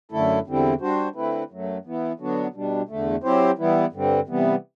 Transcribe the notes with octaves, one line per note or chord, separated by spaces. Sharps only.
F#2 D3 A3 E4 A4
E2 D3 G3 C4 E4
G3 D4 F#4 C5
D3 A3 C4 E4 B4
F#2 F#3 A3
E3 B3 E4
D3 F#3 B3 D4 F#4
B2 G3 D4
E2 D3 A3
F#3 C4 E4 G4 C5
E3 G3 B3 E4
G2 D3 G3 C4
C3 E3 G3 B3